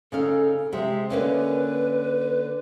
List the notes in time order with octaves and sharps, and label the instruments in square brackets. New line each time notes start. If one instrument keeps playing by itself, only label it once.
[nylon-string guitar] C#3 D#4 F5 [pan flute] A4
[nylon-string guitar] C3 G#3 [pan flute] E5
[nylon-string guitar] D3 A#3 C#4 [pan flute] B4